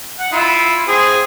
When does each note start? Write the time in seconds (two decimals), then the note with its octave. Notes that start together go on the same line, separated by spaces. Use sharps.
0.19 F#5
0.32 E4 F4
0.88 C4 G#4